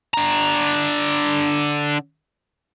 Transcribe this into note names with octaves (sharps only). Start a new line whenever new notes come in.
D3 A#5